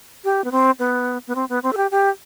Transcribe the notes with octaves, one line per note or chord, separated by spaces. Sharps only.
G4
B3
C4
B3
B3
C4
B3
C4
A4
G4
G4